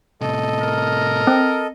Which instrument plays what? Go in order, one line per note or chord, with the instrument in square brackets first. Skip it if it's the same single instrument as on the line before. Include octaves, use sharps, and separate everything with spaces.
[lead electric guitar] A2 C3 [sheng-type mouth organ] A4 D#5
[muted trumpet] A#4
[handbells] C4